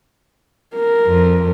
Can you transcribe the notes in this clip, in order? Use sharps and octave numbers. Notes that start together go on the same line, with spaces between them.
A#4
F2